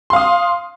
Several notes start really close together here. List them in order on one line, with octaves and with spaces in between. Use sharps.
C6 F5 D#6